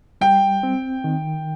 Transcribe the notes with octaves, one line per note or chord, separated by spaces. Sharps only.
G3 G5
C4
D#3